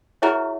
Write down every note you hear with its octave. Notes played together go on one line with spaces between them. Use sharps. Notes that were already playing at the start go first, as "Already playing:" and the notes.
E4 F#4 G#4 A#4 C#5 E5